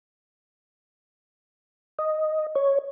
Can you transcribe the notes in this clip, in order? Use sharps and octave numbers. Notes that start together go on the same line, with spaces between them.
D#5
C#5